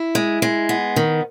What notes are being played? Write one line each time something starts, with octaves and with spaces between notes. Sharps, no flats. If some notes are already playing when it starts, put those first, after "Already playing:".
Already playing: E4
G#3
G#3
B3
D#3